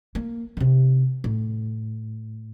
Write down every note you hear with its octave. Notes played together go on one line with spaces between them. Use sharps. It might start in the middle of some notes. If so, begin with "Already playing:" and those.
A#3
C3 D#3
A2